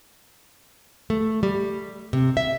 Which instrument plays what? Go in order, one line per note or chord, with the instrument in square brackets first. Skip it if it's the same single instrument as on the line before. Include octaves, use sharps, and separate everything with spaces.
[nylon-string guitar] A3
G3
C3
E5